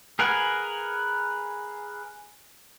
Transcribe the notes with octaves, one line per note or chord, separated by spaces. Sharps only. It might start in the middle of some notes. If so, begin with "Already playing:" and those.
G#4 A#4 B4 F#5 G#5